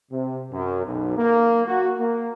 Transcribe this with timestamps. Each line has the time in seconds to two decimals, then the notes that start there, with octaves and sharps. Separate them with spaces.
0.12 C3
0.52 F#2
0.86 B1
1.18 A#3
1.68 F#4
1.99 A#3